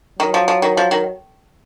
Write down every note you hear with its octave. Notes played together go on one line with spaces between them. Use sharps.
D#3 F#3
F3
F3
D#3
F3
D#3